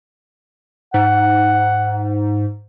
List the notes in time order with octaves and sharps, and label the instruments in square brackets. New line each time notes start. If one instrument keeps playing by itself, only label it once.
[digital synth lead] G#2 [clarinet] F#5